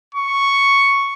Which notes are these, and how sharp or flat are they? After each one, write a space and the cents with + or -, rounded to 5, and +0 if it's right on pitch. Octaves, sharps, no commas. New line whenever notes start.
C#6 +0